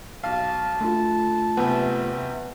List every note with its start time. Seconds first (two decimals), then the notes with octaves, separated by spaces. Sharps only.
0.23 B1 F5 A5
0.80 D3 A3 F4
1.57 F#1 C3 B3 G#5